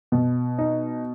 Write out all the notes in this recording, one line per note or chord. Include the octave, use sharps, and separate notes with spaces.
B2
D#4